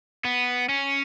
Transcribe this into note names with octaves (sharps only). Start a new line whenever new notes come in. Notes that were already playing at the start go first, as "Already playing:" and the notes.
B3
C#4